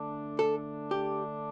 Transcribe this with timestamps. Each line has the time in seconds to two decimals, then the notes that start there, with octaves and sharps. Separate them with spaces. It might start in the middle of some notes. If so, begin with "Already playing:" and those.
Already playing: D3 A3 D4
0.39 A4
0.91 G4